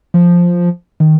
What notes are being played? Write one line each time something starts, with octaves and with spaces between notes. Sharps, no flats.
F3
D#3